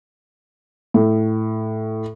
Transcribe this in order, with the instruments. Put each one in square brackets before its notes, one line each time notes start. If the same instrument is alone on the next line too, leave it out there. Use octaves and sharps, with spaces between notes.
[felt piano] A2